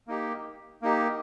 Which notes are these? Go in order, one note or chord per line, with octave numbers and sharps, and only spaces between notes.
A#3 D#4 G4
A#3 D#4 G4